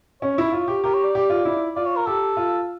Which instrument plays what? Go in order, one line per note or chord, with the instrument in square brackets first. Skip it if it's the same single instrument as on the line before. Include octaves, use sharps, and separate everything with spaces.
[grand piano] C#4 [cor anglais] C#5
[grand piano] E4
F4
G4
[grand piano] G4 [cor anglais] A#4
[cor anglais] C#5
D5
[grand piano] G4
F4
E4
[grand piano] F4 [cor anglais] D5
[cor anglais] C#5
A#4
[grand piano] G4 [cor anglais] A4
[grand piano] F4